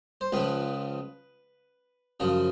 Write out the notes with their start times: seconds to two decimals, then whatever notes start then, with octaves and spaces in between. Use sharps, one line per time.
0.21 C5
0.32 C#2 C#3 F3 B4
2.20 F#2 C#3 F3